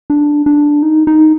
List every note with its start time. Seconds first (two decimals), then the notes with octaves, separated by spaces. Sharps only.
0.10 D4
0.46 D4
0.83 D#4
1.07 D#4